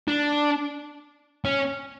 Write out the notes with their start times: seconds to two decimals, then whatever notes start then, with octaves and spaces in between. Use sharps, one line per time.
0.08 D4
1.45 C#4